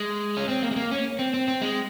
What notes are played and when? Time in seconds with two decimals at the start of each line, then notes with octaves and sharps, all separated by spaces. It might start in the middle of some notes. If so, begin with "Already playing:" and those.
Already playing: G#3
0.37 C#4
0.49 C4
0.63 A#3
0.71 G#3
0.76 A#3
0.91 C#4
1.19 C4
1.34 C4
1.48 C4
1.62 G#3